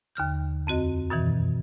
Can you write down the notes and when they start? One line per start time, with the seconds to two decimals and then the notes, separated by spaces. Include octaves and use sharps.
0.15 D#2 D3 F6 G6
0.67 F2 C4 F#4 D#5
1.10 F#2 B2 D#3 E3